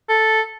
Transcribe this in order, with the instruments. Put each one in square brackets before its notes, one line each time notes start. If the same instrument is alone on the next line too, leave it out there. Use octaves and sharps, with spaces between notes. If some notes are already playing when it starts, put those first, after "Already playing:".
[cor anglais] A4